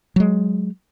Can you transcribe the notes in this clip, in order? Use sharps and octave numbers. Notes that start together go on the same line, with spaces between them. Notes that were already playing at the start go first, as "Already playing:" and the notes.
F#3 G#3